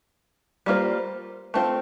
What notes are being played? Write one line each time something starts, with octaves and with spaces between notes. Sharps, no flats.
G3 A#3 F4 C5
A3 C4 F4 C5